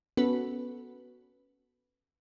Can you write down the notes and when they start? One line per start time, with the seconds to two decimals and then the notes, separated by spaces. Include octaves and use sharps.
0.17 B3 C#4 F#4 A4 B4